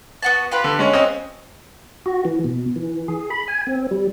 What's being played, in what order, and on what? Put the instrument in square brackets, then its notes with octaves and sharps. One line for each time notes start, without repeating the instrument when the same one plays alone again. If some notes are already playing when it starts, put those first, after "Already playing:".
[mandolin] B3 F#4 A5
F4 G4 B4
[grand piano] D3
G#3 C#4
C4 C#4 D#5
[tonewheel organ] F#4
E3
B2
E3
G#4
B5
G#5
C4
G3